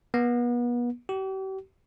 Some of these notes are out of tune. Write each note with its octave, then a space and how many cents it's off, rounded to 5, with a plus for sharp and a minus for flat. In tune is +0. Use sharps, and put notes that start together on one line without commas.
B3 -35
G4 -40